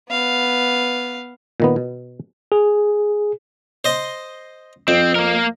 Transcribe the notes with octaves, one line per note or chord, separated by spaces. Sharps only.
B3 F5
A#2 D#3 B3
B2
G#4
C5 D#5 C6
F2 C4
A#3 A#4